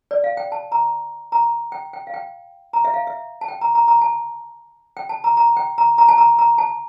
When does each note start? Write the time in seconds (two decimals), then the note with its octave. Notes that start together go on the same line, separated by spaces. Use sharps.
0.11 D5
0.24 F5
0.37 G5
0.52 A5
0.72 A#5
1.32 A#5
1.72 G5
1.93 G5
2.07 F5
2.14 G5
2.73 A#5
2.85 E5
2.94 F5
3.07 E5
3.41 A5
3.48 G5
3.61 A#5
3.75 A#5
3.88 A#5
4.01 A5
4.97 G5
5.09 A5
5.24 A#5
5.37 A#5
5.57 G5
5.78 A#5
5.98 A#5
6.08 A5
6.18 A#5
6.39 A#5
6.58 A5